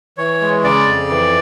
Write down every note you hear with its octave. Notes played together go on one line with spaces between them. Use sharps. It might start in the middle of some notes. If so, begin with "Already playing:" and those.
E3 C#5
G#3
C#3 D5
F2
E3